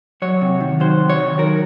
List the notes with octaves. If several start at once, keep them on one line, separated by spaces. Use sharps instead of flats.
F#3 C#5
C3
D#3
F#3 C5
C3
C#5
D#3
F#3 A#4